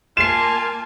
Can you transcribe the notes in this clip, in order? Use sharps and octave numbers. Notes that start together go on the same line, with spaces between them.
A#3 F4 G#5 A5 C7 E7